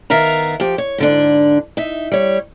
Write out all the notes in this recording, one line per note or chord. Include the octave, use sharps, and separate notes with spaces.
D#3 B3 A#4 E5 F5 A#5
F3 G4
C#5
G#2 D3 D4
D#4 E5
G3 C#5